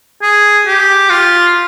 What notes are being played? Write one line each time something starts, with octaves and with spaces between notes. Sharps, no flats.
G#4
G4
F4